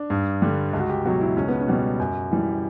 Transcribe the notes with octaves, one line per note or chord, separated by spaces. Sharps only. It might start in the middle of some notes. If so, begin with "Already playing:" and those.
Already playing: D4
G2
D3 G3
C#2
F#4
G4
B2 F#3 F#4
E4
C#2 C#4
B3
C#4
B2 G3
F#2
E3 G3